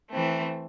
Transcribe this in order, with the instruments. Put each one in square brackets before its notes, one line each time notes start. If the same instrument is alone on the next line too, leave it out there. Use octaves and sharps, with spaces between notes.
[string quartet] E3 A3 C4